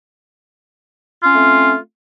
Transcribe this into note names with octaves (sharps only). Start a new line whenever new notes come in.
A3 C4 C#4 F4